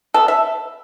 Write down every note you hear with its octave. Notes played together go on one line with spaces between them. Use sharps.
B3 A4
E5